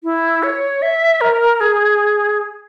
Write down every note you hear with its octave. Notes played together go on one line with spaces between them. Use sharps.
E4
C#5
E5
A#4
G#4